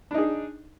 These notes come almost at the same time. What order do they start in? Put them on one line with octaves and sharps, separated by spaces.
D4 D#4 G#4